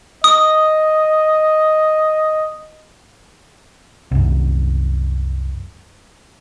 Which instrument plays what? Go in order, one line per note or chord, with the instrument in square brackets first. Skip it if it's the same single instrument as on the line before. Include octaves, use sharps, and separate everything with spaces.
[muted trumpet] D#5 [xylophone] D#6
[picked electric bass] C2 F#2